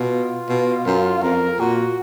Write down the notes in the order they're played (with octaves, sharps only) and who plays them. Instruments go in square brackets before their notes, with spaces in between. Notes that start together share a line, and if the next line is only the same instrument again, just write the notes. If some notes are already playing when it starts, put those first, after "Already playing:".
Already playing: [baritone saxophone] B2 [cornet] F4
[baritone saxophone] B2
F#2
[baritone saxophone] F2 [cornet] A#4
[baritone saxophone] A#2 [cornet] F#4